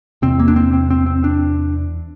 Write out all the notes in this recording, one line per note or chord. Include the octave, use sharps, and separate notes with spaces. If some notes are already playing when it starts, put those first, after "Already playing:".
E2 C3 C4
A#3
D4
C4
C4
C4
C4
D4